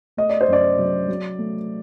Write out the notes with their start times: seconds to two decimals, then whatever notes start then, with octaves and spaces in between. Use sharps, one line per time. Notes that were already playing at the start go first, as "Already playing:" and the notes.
0.17 A3 D#5
0.30 D5
0.41 C5
0.48 F#2 D5
0.79 F#3
1.08 F#3
1.39 A3